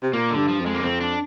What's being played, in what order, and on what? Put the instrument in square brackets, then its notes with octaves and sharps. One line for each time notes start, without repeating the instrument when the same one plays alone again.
[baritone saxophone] C3
[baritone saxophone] A#2 [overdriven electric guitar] A#3
[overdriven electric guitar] D3
[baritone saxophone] G2
[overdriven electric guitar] F3
[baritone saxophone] F2
[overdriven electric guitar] G#3
A#3
[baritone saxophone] F2 [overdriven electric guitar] C4
[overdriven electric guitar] D4